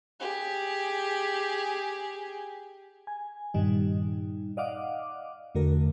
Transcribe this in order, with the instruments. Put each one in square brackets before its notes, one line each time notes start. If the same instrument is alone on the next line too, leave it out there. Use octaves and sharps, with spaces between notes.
[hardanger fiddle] G4 G#4
[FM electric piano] G#5
G2 A#2 D#3 G3 D#4
D5 D#5 F5 F#5 D6
E2 D3 A3 F#4 A#4